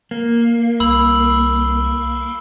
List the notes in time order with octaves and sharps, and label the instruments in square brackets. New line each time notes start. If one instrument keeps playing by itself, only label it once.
[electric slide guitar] A#3
[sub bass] C2 [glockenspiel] B5 E6 F#7